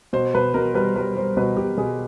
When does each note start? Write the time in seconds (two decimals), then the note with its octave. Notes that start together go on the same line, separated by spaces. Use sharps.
0.13 B2 C5
0.35 B2 B4
0.54 B2 A#4
0.74 G3 B4
0.96 G3 B4
1.16 G3 C5
1.37 B2 B4
1.57 B2 G4
1.77 B2 G#4